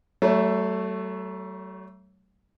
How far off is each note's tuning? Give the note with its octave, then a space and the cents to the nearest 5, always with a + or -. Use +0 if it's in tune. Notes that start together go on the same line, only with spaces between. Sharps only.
F#3 +45 A3 +5 C#5 +0